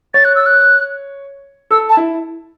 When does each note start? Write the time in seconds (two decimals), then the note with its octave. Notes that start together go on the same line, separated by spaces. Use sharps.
0.14 C#5 A6
0.25 F#6
0.35 E6
0.46 F#6
1.71 A4 E6
1.89 A5
1.97 E4